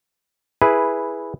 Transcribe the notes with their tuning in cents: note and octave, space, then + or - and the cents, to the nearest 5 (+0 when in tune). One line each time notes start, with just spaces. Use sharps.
E4 +0 G#4 +0 B4 -5